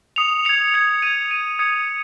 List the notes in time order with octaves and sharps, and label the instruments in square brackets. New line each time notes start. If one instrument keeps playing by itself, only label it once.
[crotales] D#6 C#7 F7
G#6 C#7 F7
G#6 C#7 F7
G#6 D#7
G#6 D#7
D#6 G#6 C#7